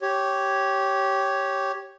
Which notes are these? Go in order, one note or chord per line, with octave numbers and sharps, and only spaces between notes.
G4 C#5